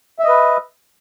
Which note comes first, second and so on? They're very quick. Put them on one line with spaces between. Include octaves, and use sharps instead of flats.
E5 D#5 B4